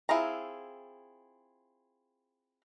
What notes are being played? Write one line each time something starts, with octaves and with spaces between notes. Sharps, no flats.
C4 E4 F4 G#4 A#5